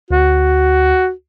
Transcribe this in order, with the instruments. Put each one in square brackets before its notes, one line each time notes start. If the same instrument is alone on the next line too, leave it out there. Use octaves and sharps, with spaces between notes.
[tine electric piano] D2 [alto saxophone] F#4